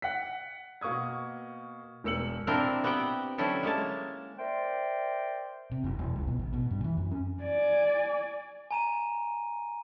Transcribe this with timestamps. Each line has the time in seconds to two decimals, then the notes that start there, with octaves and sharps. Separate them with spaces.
0.02 F#5 B6
0.81 B2 A#3 C#6 D#6 G#6
2.04 E1 A#4 E6 C#7 F#7
2.47 A#3 C4 D4 E4 A#4 C5
2.84 B3 C4 G4 F#5 G5
3.38 D3 F#3 C#4 E4 G4 A4
3.63 G#3 A#3 C#5 A5
4.37 A#4 C5 D5 E5 G5
5.71 C3
5.84 F#1
5.99 E1
6.15 C#2
6.27 B2
6.39 A1
6.53 B2
6.70 G2
6.84 E3
6.97 F#2
7.11 C#4
7.43 D5 G#5
8.71 G#5 A#5 D#7